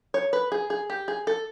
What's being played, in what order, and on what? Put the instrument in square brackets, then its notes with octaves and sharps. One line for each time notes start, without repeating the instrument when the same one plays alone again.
[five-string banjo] C#5
B4
G#4
G#4
G4
G#4
A4